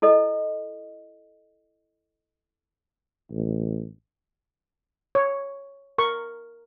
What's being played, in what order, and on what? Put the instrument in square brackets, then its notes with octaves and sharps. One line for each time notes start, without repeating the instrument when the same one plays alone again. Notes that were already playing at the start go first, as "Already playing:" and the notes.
[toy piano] E4 A4 D#5
[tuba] A1
[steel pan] C#5
A#4 C#6